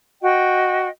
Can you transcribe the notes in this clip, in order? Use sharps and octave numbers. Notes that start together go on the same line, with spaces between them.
F#4 D#5 G5